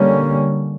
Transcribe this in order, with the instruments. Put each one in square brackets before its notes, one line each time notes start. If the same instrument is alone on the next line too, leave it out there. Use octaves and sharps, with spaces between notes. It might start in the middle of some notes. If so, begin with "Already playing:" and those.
Already playing: [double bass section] D3 G3 A#3 C#4